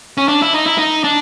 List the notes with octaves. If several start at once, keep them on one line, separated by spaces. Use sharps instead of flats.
C#4
D4
E4
D#4
E4
D#4
D4